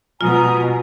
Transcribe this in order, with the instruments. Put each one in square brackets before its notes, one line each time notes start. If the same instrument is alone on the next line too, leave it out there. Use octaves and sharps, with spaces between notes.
[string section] B2 [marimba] F4 [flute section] G#5 A#5 D#6